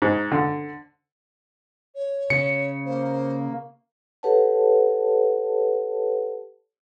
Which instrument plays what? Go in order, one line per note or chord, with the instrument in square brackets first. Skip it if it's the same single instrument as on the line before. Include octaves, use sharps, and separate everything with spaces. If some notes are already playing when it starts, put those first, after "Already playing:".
[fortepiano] G#2
D3
[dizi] C#5
[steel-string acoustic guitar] C#3 [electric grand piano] C#7
[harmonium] A#3 [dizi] C5
[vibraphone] G4 A4 B4 C#5 F#5 A5